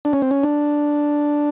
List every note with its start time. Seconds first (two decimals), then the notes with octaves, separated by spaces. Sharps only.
0.05 D4
0.13 C#4
0.22 C4
0.31 C#4
0.43 D4